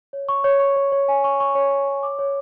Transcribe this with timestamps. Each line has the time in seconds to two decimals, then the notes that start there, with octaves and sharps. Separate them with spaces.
0.13 C#5
0.29 C#6
0.44 C#5
0.60 C#6
0.76 C#5
0.92 C#5
1.08 G#5
1.24 C#6
1.40 C#6
1.55 C#5
1.71 C#6
1.88 C#5
2.03 D6
2.19 C#5